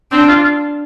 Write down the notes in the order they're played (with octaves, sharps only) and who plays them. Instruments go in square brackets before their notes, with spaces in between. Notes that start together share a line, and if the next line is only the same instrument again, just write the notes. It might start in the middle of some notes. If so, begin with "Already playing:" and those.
[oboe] C4 [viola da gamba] D4
[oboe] F4